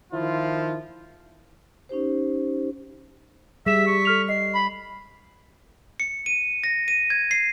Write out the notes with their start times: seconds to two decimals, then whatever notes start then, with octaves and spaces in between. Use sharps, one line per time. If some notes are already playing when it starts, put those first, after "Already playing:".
0.12 D#3 F3 E4 F4
1.89 C#4 D#4 G4 C5
3.66 G3 G#4 E5 B6 E7
3.87 C#6
4.05 A4 F6 F7
4.29 D#5 C7
4.54 B5
6.00 C#7
6.26 D#7
6.64 A#6
6.88 D#7
7.10 G#6
7.31 C7